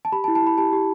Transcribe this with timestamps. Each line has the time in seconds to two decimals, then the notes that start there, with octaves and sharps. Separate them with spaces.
0.05 A5
0.12 G4 B5
0.24 A5
0.28 E4
0.35 A5
0.43 E4 B5
0.58 G4 A5
0.73 G4